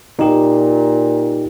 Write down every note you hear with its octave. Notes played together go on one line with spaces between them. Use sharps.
A#2 D#4 G4